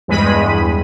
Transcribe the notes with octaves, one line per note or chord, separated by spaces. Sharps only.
E2 G2 G#3 B5 D#7